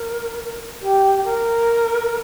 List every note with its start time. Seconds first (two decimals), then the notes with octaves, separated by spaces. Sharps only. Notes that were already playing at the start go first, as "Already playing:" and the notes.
Already playing: A#4
0.81 G4
1.24 A#4